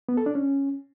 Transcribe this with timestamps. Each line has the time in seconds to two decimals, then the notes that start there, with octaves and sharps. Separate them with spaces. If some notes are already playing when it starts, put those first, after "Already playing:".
0.09 B3
0.17 A4
0.26 D4
0.35 C#4